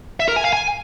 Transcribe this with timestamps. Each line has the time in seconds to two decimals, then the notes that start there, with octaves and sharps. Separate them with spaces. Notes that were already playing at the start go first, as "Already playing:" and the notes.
0.20 E5
0.28 A#4
0.36 G#5
0.45 F5
0.53 G#5